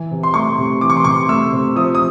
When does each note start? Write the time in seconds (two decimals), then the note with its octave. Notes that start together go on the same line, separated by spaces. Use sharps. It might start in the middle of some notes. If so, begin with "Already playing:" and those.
Already playing: E3
0.11 C3
0.23 C6
0.34 A3 C#6
0.58 C3
0.81 E3 D6
0.90 C#6
0.97 C6
1.04 C3 C#6
1.29 A3 E6
1.53 C3
1.76 F3 D#6
1.95 D#6